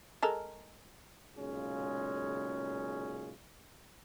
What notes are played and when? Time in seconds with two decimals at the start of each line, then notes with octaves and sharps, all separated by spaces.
0.23 G#3 A4 A#4
1.37 B1 A#2 C#3 G#3 C#4